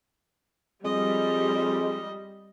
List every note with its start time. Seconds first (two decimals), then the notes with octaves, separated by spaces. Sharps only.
0.84 F2 G3 G#3 D#5